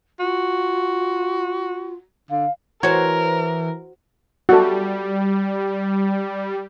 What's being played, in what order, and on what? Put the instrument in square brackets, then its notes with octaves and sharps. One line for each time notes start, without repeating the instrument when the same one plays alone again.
[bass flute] F4 [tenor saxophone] F#4
[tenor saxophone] D3 [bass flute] F5
[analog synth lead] E3 [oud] F#4 C5 [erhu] A#4 [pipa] C#5
[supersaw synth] G3 [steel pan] F#4 A4